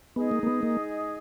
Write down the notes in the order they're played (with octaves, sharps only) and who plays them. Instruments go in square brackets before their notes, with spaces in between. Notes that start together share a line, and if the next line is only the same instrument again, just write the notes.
[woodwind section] G#3 D#4 G#4 D#5 [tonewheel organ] B3
[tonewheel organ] A#3
A#3
B3
A#3